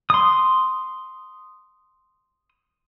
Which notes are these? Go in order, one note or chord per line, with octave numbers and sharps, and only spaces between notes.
C6 D#6